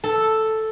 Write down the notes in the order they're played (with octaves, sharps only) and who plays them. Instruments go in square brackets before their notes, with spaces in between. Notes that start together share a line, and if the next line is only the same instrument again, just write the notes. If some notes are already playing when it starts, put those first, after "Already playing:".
[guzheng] A4